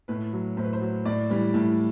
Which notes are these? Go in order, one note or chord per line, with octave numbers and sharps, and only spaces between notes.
A2 B4
F#3
A2 C5
B4
C5
F#3
A2 D5
E3 G3
A2